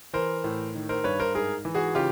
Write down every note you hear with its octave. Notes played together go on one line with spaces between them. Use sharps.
E3 A#4 C5
A2
D#3
A#4 C5
G2 B4 C#5
A#4 C5
G#2 G#4 A#4
E3
F#4 G#4
C#3 F4 G4